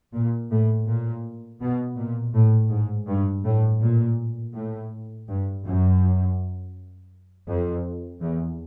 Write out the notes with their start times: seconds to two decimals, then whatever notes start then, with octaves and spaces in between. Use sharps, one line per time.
0.14 A#2
0.51 A2
0.87 A#2
1.61 B2
1.97 A#2
2.34 A2
2.70 G#2
3.07 G2
3.45 A2
3.81 A#2
4.55 A2
5.28 G2
5.64 F#2
7.48 F2
8.21 E2